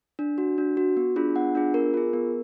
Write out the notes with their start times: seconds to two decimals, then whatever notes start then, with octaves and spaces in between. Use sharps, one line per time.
0.19 D4
0.38 F#4
0.58 D4
0.77 F#4
0.97 B3
1.16 D4 F4 G#4
1.35 B3 F#5
1.55 D4 F4 G#4
1.74 B3 A#4
1.94 F4 G#4
2.13 B3